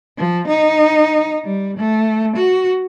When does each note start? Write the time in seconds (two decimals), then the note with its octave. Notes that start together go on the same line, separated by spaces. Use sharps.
0.18 F3
0.48 D#4
1.44 G3
1.77 A3
2.37 F#4